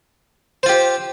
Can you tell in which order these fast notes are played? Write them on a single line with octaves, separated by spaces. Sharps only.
C5 F4 G4